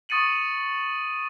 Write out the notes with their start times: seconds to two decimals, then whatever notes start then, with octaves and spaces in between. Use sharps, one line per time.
0.09 C#6 D#6 A6 C#7 D#7 F#7